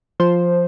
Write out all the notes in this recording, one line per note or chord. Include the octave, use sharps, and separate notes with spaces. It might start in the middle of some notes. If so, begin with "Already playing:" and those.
F3 C5